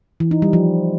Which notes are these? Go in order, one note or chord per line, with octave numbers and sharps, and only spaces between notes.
E3
D#4
G3
F3